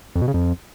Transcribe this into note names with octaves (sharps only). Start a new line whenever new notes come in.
F2
B2
C#3
F2